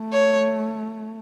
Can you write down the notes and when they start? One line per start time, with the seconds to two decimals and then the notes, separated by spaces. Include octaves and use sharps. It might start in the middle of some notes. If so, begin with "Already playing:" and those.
Already playing: A3
0.13 C#5